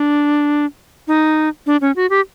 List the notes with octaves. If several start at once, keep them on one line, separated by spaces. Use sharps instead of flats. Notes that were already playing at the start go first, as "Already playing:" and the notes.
Already playing: D4
D#4
D4
C#4
F#4
G4